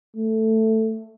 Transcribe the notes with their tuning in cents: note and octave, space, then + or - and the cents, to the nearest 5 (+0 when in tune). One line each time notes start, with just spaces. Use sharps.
A3 +5